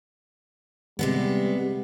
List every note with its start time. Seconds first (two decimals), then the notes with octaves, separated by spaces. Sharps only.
0.99 C3 G3 G#3 B3